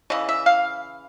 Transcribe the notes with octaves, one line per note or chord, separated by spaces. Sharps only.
C#3 E3 D#5
E5
F5